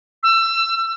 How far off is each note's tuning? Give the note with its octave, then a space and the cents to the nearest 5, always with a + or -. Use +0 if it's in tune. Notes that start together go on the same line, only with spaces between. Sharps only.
E6 +25